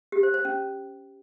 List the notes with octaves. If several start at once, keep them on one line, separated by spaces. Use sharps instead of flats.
G4
C5
C5
C#4